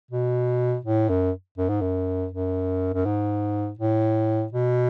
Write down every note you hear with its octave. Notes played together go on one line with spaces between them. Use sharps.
B2
A2
F#2
F#2
G#2
F#2
F#2
F#2
G#2
A2
B2